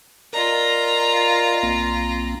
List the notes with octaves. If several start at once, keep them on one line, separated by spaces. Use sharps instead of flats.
F4 A#4 D5 D#5 A#5
B1 A#3 C4